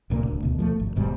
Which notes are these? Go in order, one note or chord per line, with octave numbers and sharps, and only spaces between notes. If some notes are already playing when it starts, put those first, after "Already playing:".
C2 A#2 A3 A#3
D1 D2
D2 B2
F3 G#3 A3
G#1
D#1 G#2 B2 G3